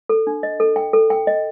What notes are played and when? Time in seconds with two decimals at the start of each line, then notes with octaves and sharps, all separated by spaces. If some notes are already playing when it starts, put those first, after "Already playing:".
0.09 A4
0.27 D4
0.43 D#5
0.60 A4
0.76 G5
0.93 A4
1.10 G5
1.27 D#5